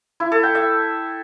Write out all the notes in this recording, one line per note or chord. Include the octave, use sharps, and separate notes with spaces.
E4
A4
G5
E5